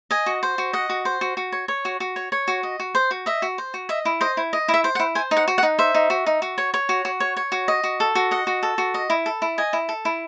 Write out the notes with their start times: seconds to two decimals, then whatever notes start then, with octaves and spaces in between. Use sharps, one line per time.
0.11 D#5 G#5
0.26 F#4
0.43 C5
0.58 F#4
0.73 D#5 F#5
0.90 F#4
1.05 C5
1.21 F#4
1.37 F#4
1.52 C#5
1.68 C#5
1.85 F#4
2.00 F#4
2.16 C#5
2.32 C#5
2.48 F#4
2.63 D#5
2.80 F#4
2.95 C5
3.11 F#4
3.26 D#5 E5
3.42 F#4
3.58 C5
3.74 F#4
3.89 D#5 E5
4.05 E4
4.21 C5 D#5
4.37 E4
4.53 D#5
4.68 E4
4.74 E5
4.84 C5
4.95 F#5
5.00 E4
5.15 C5 G#5
5.31 D#4
5.37 F#5
5.48 F#4
5.58 F#5
5.63 D#4
5.79 C5 E5
5.94 D#4
6.10 F#4
6.26 D#4
6.42 F#4
6.58 C#5
6.74 C#5
6.89 F#4
7.05 F#4
7.20 C#5
7.37 C#5
7.52 F#4
7.68 D#5
7.84 F#4
8.00 A4
8.15 F#4
8.31 D#5 F#5
8.47 F#4
8.63 A4
8.78 F#4
8.94 D#5
9.10 E4
9.26 A4
9.42 E4
9.58 D#5 G#5
9.73 E4
9.89 A4
10.05 E4